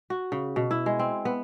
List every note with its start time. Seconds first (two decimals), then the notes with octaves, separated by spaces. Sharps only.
0.10 F#4
0.32 C#3
0.56 B2
0.71 E4
0.86 G#3
0.99 C4
1.25 B3